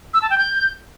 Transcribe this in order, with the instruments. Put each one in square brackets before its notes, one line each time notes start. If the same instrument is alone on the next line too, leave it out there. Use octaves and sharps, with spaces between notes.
[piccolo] E6
A5
G5
G6